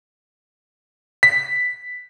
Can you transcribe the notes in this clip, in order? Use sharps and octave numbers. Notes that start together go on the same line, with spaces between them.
B6